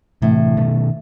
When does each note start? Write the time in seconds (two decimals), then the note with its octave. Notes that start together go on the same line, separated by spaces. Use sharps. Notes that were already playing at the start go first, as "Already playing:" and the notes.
0.22 A2 C3 E3
0.57 B2 D#3 A3